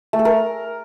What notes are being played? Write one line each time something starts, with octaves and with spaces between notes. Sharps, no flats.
A3
A4
A#4